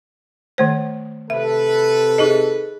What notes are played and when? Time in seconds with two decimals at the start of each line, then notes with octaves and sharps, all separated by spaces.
0.58 D#3 A3 C5
1.30 C3 A4 B4 E5
2.18 D#4 G#4 D#5